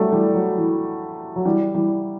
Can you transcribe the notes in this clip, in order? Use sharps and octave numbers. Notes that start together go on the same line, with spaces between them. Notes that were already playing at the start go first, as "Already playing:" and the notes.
Already playing: F#3 G3 A3
E3 G3
F#3
E3
F#3
E3 G3
E3 G3